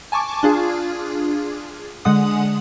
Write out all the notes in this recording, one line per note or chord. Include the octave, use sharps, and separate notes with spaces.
G#5 A5 C#6 D6
D4 F4 G#4
D3 G#3 F#5 D#6